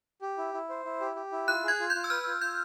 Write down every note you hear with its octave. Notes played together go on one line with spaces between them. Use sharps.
G4
E4
E4
C5
E4
G4
G4
E4
F4 F#6
G#4 G#6
F4
G6
F4
E6
B4 F6
F4
F4 G6